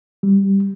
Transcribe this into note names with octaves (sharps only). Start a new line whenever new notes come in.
G3